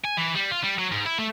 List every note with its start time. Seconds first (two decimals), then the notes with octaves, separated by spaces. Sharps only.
0.04 G#5
0.17 E3
0.35 G3
0.51 F4
0.63 G3
0.79 F#3
0.92 G#2
1.05 E4
1.19 A3